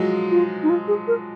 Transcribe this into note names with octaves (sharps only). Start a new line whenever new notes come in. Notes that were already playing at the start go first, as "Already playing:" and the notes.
Already playing: F3 F#3 G#3
F4
D#4
F4
G#4
A#4